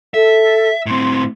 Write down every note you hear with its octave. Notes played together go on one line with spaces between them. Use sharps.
A4 E5
A2 C4 C6